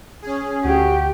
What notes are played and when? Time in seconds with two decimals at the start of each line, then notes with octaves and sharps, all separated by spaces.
0.22 C#4 G#4
0.64 D2 F#4 G4